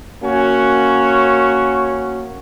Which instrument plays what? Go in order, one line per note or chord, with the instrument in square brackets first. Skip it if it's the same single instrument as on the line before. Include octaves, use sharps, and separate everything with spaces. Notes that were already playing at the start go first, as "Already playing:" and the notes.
[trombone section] A#3 C#4 F#4